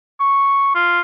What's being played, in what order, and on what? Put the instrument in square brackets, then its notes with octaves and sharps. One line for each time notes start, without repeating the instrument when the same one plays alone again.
[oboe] C#6
F4